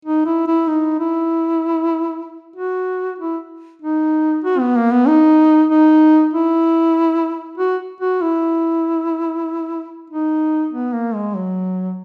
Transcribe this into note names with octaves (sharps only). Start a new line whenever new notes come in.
D#4
E4
E4
D#4
E4
F#4
E4
D#4
F#4
B3
A#3
B3
D#4
D#4
E4
F#4
F#4
E4
D#4
B3
A#3
G#3
F#3